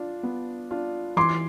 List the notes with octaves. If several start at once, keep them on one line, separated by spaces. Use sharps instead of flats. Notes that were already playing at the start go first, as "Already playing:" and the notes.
Already playing: D4 F4
B3
D4 F4
E3 C6 D6